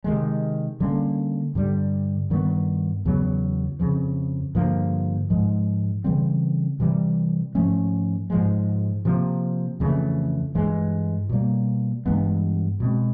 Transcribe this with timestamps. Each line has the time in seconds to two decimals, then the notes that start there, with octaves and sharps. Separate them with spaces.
0.04 C3 D#3 G#3
0.80 D3 G3 A#3 C#4
1.55 G2 D3 G3
2.30 G2 D#3 G3 B3
3.05 E2 C#3 F#3 B3
3.80 F2 C#3 F3
4.55 G2 D3 F3 A#3
5.30 G#2 F3 G#3
6.04 C#3 E3 G3 C4
6.80 C3 E3 G3
7.55 G#2 F3 A3 C#4
8.30 G#2 F3 G#3
9.05 C3 F3 A#3
9.80 F2 C#3 E3 A3
10.55 G2 E3 G#3
11.29 B2 G3 A#3
12.06 G2 E3 G#3 B3
12.80 B2 G#3 C4